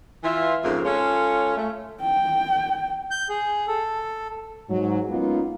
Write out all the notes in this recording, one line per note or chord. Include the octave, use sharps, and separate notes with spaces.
E3 F4 E5
F2 G#2 C#3 A#3 C4 F4
G#3 C#4 F4 A4 C#5
A3
G5
G6
G#4
A4
G#2 F#3
G#3 A#3 B3 C#4 D#4 F4